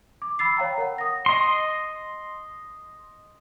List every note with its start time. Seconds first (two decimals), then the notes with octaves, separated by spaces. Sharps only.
0.22 D6
0.39 B5 E6 A6 C7
0.57 C#5 F5 G5 A#5
0.78 A#4 F#5
0.98 D#6 A#6
1.26 D#5 C6